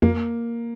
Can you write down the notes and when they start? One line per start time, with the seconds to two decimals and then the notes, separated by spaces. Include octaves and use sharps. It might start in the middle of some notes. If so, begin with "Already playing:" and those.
0.02 F2 A#3